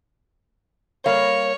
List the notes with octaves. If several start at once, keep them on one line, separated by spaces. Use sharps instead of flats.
G3 A#3 C#5 F5